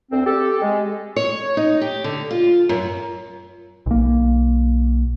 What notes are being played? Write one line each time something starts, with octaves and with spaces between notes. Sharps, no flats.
D2 C4
G4 A4
G#3
C#5
D#4
G4
D3
F4
F#2
B1 A#3